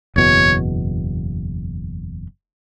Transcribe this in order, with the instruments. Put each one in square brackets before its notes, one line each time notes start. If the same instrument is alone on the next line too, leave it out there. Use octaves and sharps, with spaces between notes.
[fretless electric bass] F#1 E2 B2 [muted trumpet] C#5